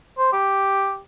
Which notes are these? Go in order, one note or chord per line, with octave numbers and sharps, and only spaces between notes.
C5
G4